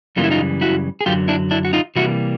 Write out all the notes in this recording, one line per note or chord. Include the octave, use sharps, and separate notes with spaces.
F#2 C#3 E3 G3 A#3 F4
E4
D#4 F4
E4 F#4
G#4
F#2 D3 F#3 F4 G4
D4 E4
D4 E4
F#4
D#4 F4
C3 E3 G3 A#3 E4 F#4